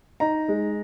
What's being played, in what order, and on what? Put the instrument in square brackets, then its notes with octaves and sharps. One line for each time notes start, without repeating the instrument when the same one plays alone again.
[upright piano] D#4 A#5
G#3